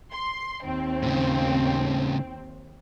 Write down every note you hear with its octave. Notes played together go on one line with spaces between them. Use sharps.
C6
D#2 C4
A2 C#3